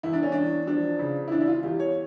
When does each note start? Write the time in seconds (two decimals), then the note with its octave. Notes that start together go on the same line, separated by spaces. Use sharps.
0.03 E2 E4
0.13 D4
0.23 C#4
0.32 E2 D4
0.67 F3 D4
0.99 C#3
1.28 E4
1.31 E2 D4
1.41 E4
1.48 F4
1.63 E2 G4
1.80 C#5